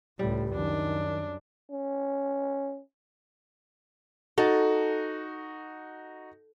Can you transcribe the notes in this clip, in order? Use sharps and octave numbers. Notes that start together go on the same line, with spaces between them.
C#2 A2 G3
F#2 D#3 D4
C#4
D#4 F#4 A4